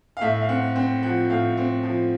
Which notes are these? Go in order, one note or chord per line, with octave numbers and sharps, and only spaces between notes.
F5
A2 E5
E5
F5
C4 F#5
C4 G5
F3 F#5
A2 F5
C4
F3